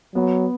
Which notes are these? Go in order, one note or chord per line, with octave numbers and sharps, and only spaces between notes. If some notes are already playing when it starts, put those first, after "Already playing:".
F#3 B3